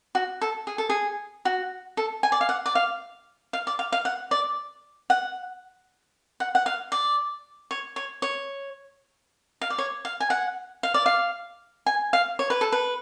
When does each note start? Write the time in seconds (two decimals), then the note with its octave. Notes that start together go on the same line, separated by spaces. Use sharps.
0.15 F#4
0.42 A4
0.67 G#4
0.78 A4
0.90 G#4
1.45 F#4
1.97 A4
2.23 G#5
2.32 D5
2.41 F5
2.49 F#5
2.66 D5
2.75 F5
3.53 F5
3.67 D5
3.79 F5
3.92 F5
4.05 F#5
4.31 D5
5.10 F#5
6.40 F#5
6.55 F#5
6.66 F5
6.92 D5
7.71 C#5
7.96 C#5
8.22 C#5
9.61 F5
9.70 D5
9.78 C#5
10.05 F5
10.20 G#5
10.30 F#5
10.83 F5
10.94 D5
11.06 F5
11.86 G#5
12.13 F5
12.39 C#5
12.50 B4
12.61 A4
12.72 B4